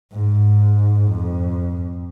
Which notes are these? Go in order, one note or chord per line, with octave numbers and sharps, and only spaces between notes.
G#2
F2